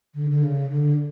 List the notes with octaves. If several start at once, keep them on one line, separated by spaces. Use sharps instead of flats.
D3
D3
C#3
D3